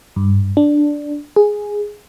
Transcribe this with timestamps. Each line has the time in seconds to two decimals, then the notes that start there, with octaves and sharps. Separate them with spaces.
0.16 G2
0.57 D4
1.36 G#4